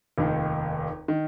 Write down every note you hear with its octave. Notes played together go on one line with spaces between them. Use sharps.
F1 D#2 D#3
D#3